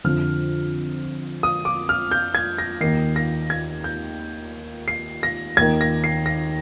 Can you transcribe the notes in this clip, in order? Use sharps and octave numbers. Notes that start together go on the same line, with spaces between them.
F2 D3 F3 F6
D#6
D6
F6
G6
G#6
A#6
D#2 D#3 C7
A#6
G#6
G6
C7
A#6
D#2 D#3 G#6
A#6
C7
A#6